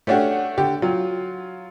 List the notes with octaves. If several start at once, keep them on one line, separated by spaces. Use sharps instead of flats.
A3 C#4 D4 F#4 G4
D3 G4
F#3 F4